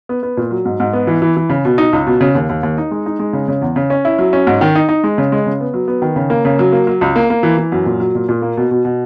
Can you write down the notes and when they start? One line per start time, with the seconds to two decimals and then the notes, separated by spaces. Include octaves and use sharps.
0.09 B3
0.23 B3
0.37 A#2
0.51 F#3
0.65 G#2
0.80 G#2
0.93 B3
1.07 E3
1.22 E3
1.36 E3
1.50 C#3
1.65 B2
1.78 D#4
1.93 C#2
2.07 B2
2.21 C#3
2.35 D#2
2.49 D#2
2.63 D#2
2.78 D#4
2.91 G#3
3.06 D#4
3.19 G#3
3.33 C#3
3.48 C#3
3.62 E2
3.76 C#3
3.90 C#4
4.05 E4
4.19 F#3
4.33 C#4
4.47 G#2
4.61 D#3
4.75 D#4
4.89 D#4
5.04 G#3
5.18 C#3
5.32 G#3
5.46 C#3
5.60 B3
5.74 F#3
5.88 B3
6.02 D#3
6.16 C#3
6.30 A#3
6.45 C#3
6.59 F#3
6.72 A#3
6.87 F#3
7.01 C#2
7.16 A#3
7.30 A#3
7.43 E3
7.57 E3
7.72 F#2
7.86 A#2
8.00 F#3
8.15 A#2
8.29 A#2
8.42 A#3
8.57 B2
8.71 B2
8.85 B2